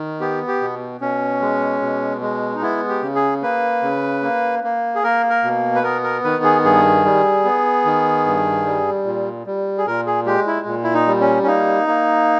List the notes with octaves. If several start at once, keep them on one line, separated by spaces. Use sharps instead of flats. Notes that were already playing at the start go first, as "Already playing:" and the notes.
Already playing: D#3
B3 G4
G4
B2
B2 C#4
G#3
B2
G#3
D#4
B3 E4
G4
C#3
G#4
A#3 B4
C#3
A#3
A#3
G#4
A#3 A#4
A#4
B2
B4
B3 A#4
A#4
D#3 B4
G#4
G2 G#4
G3
B3
D#3
G2
G3
A#2
G3
G#4
A#2 A#4
G#4
G#3 G4
E4
A#2
E4
D#4
G3
C#4
C#4
A#3 D#4
A#3